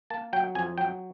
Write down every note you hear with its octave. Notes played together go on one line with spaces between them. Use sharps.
A#3 A5
F#3 G5
F2 G#5
F#3 G5